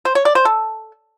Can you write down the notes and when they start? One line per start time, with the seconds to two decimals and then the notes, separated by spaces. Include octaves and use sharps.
0.05 C5
0.15 C#5
0.25 D5
0.35 C5
0.45 A4